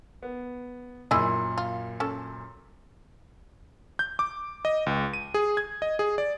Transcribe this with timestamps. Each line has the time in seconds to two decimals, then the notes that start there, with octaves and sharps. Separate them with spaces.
0.23 B3
1.11 F#2 A#2 E4 G#4 D#5
1.58 F4
2.00 C#4 A4
3.99 G6
4.19 D6
4.65 D#5
4.86 C#2
5.14 D#7
5.34 G#4
5.57 G#6
5.82 D#5
5.99 G#4
6.18 D5